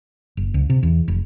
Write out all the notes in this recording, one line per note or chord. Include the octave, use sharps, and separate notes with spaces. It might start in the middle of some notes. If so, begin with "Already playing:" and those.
F#1
C#2
C3
E2
F1